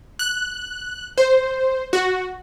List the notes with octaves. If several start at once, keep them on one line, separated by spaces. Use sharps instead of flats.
F#6
C5
F#4